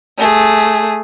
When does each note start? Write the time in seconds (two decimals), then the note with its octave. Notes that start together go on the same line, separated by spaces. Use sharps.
0.18 A3 G#4